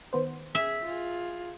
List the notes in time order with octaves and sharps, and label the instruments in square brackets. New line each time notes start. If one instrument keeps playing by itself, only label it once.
[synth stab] D#3 B3 C5
[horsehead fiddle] G#4 [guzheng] E5
[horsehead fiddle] F4 G#4